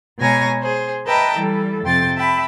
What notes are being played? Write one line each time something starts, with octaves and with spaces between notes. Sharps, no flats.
B2 G#3 C#5 G#5 A#5 A#6
G#4 C5
B4 D#5 E5 G5 A5 A#5
E3 G3 A4
F2 C3 G5 C6 A6
E5 G5 A5 B5